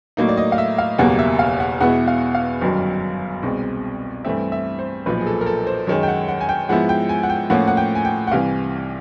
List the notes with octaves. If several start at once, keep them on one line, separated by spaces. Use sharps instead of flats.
A2 F#3 A#3 D#4
D5
D#5
F5
E5
F5
F#1 E2 B2 G3 A#3 F#5
E5
F5
F#5
E2 B2 G#3 B3 E4 F#5
F5
F5
G1 F#2 D#3 F#3
C2 B2 G#3 C4
G2 E3 A3 C4 E5
E5
C5
B1 A#2 F3 B4
G#4
A4
A#4
A4
C5
F#2 D#3 G#3 C#5
G5
F#5
F#5
G#5
G5
G#2 F3 G#3 B3 E4 F#5
G5
G#5
F#5
G5
A2 F3 A#3 C#4 F#5
F#5
G5
G#5
G5
F#5
C2 C3 E3 F5